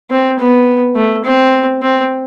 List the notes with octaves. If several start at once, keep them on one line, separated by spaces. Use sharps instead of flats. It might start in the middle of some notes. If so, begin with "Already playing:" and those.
C4
B3
A3
C4
C4